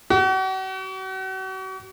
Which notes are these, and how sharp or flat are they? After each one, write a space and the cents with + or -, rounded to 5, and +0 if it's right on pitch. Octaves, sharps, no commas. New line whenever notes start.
F#4 +40